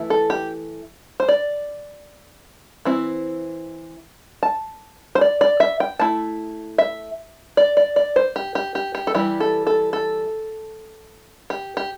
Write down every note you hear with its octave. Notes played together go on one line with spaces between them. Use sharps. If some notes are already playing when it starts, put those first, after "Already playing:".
Already playing: E3 A3 E4
A4
G4
C5
D5
E3 C4 E4
A5
C5
D5
D5
E5
G5
A3 E4 A5
E5
D5
D5
D5
C5
G4
G4
G4
G4
A4
E3 G3 E4 G4
A4
A4
A4
G4
G4